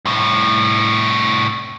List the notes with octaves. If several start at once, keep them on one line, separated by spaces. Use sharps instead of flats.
C2 A2